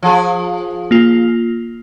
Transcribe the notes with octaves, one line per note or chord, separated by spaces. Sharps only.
F3 G#4
A#3 F4